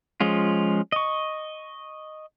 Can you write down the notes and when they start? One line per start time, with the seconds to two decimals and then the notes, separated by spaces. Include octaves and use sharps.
0.21 F3 G#3 C#4 F4
0.92 D#5 C#6